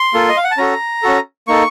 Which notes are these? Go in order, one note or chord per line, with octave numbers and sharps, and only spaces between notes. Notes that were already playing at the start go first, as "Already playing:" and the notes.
Already playing: C6
A#3 F4 A4
D#5
F5
F#5
A5
C#4 F#4 A4 A#5
C#4 F#4 A4
A#3 D#4 A4 C#6